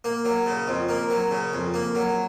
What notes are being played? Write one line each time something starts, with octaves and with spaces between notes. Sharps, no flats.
A#3
F#3
C#3
F2
A#3
F#3
C#3
F2
A#3
F#3